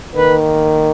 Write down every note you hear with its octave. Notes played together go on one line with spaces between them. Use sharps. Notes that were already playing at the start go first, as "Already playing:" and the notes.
D#3 A#3 B4